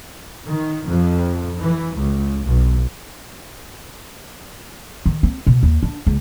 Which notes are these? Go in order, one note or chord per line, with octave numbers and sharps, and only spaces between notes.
D#3
F2
E3
C#2
B1
D#3
C4
B2
D#2
D4
C#2